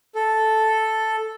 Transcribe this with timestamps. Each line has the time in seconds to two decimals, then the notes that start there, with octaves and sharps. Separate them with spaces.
0.15 A4